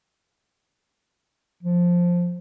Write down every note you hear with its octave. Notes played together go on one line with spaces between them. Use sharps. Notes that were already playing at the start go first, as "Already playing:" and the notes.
F3